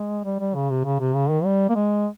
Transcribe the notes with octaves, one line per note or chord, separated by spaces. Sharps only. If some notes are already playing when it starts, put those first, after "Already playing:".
Already playing: G#3
G3
G3
C#3
C3
C#3
C3
C#3
D#3
G3
A#3
G#3